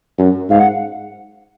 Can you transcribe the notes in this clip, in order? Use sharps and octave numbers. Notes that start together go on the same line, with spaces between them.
F#2
G#2 F5
F#5